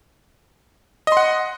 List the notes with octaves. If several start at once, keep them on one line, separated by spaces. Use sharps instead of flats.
D#5 F#5 C6